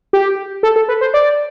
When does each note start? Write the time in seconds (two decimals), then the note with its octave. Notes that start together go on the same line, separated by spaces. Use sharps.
0.13 G4
0.63 A4
0.76 A4
0.88 B4
1.01 C5
1.14 D5